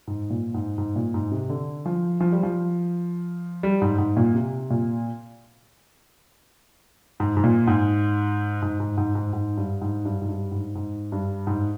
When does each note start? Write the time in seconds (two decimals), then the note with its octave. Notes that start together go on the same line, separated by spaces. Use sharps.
0.07 G#2
0.30 A#2
0.54 G#2
0.78 G#2
0.96 A#2
1.14 G#2
1.31 C3
1.49 D3
1.86 F3
2.20 F3
2.32 G3
2.43 F3
3.63 G3
3.82 G#2
3.98 G#2
4.17 A#2
4.34 C3
4.70 A#2
7.20 G#2
7.37 G#2
7.44 A#2
7.67 G#2
8.62 G#2
8.80 G#2
8.97 G#2
9.15 G#2
9.33 G#2
9.57 G2
9.81 G#2
10.05 G2
10.22 G#2
10.29 G2
10.51 G#2
10.75 G#2
11.12 G2
11.47 G#2